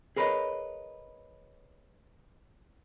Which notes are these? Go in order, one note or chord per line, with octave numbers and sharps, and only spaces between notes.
G#4 A#4 B4 C#5 D#5